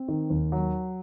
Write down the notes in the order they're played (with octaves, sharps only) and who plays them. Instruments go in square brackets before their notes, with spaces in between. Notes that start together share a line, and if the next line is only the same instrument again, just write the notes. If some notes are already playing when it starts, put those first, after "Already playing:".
Already playing: [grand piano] C4
D#3
D#2
F#3